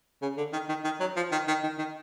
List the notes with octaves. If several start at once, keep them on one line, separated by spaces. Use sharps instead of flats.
C#3
D3
D#3
D#3
D#3
F#3
F3
D#3
D#3
D#3
D#3